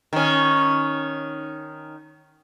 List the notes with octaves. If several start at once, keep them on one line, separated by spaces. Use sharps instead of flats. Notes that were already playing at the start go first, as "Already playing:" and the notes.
D#3 C#4